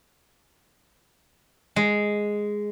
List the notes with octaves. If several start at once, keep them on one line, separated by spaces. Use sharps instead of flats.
G#3